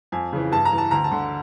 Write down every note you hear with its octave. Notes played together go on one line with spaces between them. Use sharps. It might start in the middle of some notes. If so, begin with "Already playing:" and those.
F2 G#5
C#3 E3
G2 A5
A#5
E3
A5
D2 A#5
A5
D3